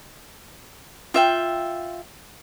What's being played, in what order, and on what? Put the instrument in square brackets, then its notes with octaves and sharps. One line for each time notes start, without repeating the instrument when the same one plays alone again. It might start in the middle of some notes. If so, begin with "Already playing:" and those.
[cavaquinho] F4 E5 G5